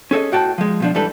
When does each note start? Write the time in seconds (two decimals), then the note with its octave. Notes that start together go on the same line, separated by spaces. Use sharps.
0.11 C#4 G#4 A4 D#5
0.32 A2 F#4 G5 A5
0.58 F3 G#3
0.80 B2 F3 D4
0.94 G#2 E3 G3 D4 A4 B4